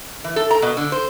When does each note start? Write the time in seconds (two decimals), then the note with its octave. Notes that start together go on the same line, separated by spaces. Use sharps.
0.24 E3
0.36 A4
0.51 A#5
0.62 B2
0.77 D3
0.92 C5